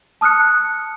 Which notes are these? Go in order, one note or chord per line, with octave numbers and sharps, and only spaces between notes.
A5 D#6 F6 F#6 C#7